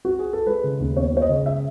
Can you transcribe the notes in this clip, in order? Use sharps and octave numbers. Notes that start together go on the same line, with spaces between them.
F#4
G#4
A4
G#3 B4
C#3
D#2
B3 C#5
G#3 C#5
D#5
C#3
E5